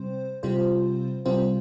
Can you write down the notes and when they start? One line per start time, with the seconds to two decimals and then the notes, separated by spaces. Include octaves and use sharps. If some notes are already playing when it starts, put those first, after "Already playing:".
Already playing: C3 G3 C4 C5
0.43 C3 G3 C4 F4 C5
1.25 C3 G3 C4 F4 C5